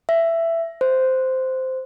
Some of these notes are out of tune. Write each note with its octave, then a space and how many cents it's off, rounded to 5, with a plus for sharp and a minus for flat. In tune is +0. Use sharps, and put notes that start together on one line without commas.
E5 +15
C5 -10